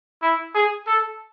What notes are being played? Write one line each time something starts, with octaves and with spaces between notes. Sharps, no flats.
E4
G#4
A4